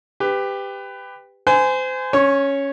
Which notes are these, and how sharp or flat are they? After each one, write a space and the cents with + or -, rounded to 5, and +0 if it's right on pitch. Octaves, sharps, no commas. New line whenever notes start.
G4 +15 B4 +20
C5 -30 G#5 +0
C#4 +0 C#5 +0 C#6 -40